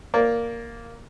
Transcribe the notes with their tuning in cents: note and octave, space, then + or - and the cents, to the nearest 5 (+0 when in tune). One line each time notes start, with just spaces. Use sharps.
A#3 +0 D5 -20